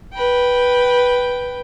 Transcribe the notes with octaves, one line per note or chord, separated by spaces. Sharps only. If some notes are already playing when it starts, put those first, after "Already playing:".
B4 G5